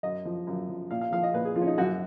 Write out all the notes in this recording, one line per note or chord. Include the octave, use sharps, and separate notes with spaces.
F#2 D#5
F3
F#2
F3
A#2 F5
F5
F3 F5
D#5
A#2 B4
G#4
F3 F4
C#4
D#4
F#2 F#4